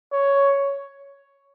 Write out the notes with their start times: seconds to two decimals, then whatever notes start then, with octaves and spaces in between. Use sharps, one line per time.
0.12 C#5